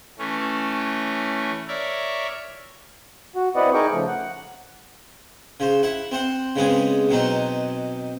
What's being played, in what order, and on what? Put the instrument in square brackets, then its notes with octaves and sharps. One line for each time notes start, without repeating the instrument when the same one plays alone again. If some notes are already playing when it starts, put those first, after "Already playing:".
[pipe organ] E3 A3 C#4
A#4 C#5 D5 E5
[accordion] F#4
C4 E4 B4 D5 D#5 F#5
D#4 G#4 A#4 G5 C#6 D6
C#3 F3 A3
F#5
[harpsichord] C#3 C5
E4 F#5
C4 C5 F#5
C#3 G#3 B3 C4 G#4
B2 F#3 C4 D#4